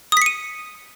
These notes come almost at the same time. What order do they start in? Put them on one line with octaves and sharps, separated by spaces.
D#6 B6 C#7 D#7